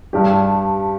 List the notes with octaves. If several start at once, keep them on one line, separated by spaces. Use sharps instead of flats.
G2 G3 D4 G4